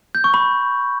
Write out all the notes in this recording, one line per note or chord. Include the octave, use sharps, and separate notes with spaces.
G6
C#6
B5